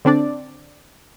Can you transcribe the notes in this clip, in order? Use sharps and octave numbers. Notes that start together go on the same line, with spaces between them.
D3 C4 D4 D5